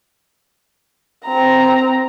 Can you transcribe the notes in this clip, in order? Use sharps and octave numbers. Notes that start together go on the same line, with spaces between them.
C4 A#5